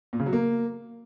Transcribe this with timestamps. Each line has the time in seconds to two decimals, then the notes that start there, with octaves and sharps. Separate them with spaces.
0.13 A#2
0.20 C#3
0.26 F#3
0.33 A#3